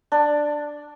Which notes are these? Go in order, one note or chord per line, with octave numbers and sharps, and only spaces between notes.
D4